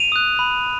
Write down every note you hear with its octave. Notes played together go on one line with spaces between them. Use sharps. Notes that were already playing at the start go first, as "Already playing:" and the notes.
Already playing: D#7 F7
D#6 F#6
B5